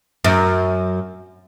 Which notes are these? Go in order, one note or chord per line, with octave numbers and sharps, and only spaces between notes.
F#2